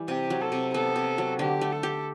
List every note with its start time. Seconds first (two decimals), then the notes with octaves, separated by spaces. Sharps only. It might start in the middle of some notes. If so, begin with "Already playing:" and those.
Already playing: E3 G3
0.08 C3 G4
0.30 F#3
0.41 A4
0.52 C3
0.74 B3 A4
0.96 C3
1.18 F#3
1.39 D3 G4
1.61 A3
1.72 A4
1.83 G4